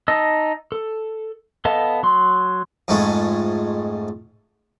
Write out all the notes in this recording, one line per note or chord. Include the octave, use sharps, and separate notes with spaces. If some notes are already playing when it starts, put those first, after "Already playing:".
D#4 D#5 A5 E6
A4
B3 A4 D#5 F5 A5
F#3 C6
F2 G#2 G#3 A3 C#4